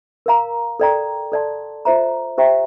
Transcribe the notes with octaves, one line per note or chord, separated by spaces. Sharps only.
A#4 F5 A#5
A4 D5 G5 A#5
A4 D5 A5 C6
F4 C5 E5 A#5
G4 C5 E5 G5 A#5